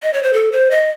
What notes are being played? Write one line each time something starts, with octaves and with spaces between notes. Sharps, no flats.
D#5
C#5
C5
A4
C5
D#5